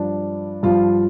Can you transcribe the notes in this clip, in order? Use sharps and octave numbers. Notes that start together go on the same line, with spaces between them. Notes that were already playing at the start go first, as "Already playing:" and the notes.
Already playing: G2 F3 D4
G2 F3 F4